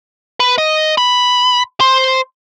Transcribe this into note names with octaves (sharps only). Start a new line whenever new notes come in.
B4
D#5
B5
C5